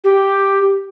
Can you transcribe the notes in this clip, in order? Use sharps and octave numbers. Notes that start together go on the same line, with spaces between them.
G4